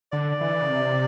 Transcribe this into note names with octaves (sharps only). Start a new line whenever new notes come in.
D3 D5
E3
C#3
C3